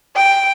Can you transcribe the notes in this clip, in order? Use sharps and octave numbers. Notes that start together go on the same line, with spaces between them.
G5